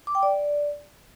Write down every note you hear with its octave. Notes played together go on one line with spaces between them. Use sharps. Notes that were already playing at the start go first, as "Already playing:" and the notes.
D6
G5
D5